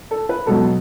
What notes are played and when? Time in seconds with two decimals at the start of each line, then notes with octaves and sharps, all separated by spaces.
0.11 A4
0.29 B4
0.47 B2 F#3 A4